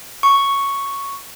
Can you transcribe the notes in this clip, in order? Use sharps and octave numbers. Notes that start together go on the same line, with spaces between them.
C#6